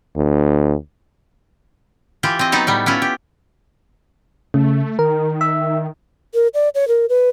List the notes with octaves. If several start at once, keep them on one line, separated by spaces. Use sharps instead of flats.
D2
E3 F4 G4
C4 D#5
F#3 B3 D#4 A5
A2 G3 B3
B3 C#4 E4 F4
G4
C#3 A3
D#3 A#4
E5
A#4
D5
C#5
A#4
B4